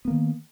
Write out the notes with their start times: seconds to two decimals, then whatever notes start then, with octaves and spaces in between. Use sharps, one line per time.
0.05 B3
0.08 A#3
0.10 D#3